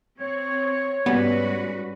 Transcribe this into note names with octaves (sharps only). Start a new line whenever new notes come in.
C4 C#5
G#2 G3 B3 C#4 F#4 B4